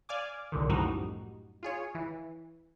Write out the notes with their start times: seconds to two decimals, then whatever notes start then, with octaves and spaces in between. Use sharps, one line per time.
0.09 D5 F5 G#5 D6
0.52 C2 A#2 D3 D#3
0.69 F#2 A2 F3 G3 D#4 F#4
1.63 F4 G#4 C#5
1.95 E3